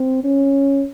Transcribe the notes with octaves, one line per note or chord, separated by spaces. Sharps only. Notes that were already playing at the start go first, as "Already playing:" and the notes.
Already playing: C4
C#4